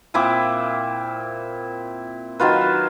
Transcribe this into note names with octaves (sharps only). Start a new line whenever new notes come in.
A#2 C4 E4 D6
D#3 F#3 F4 B4